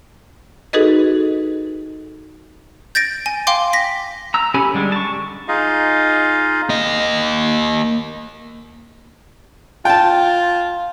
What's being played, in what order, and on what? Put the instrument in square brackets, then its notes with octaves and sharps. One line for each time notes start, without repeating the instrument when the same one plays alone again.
[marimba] D#4 F#4 G#4 A4 B4 D#5
[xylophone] G6 A6 A#6 D7
G#5
F5 G5 C6 D6
A#6 B6
[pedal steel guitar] A#5 E6
C#4 G4 A4 G#5 B5
D3 G3 G#3 D4
A5 C#6
[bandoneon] D#4 F4 G#4 D#5 F5
[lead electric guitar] A#3 D#5
[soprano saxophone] F4 [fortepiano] G5 A5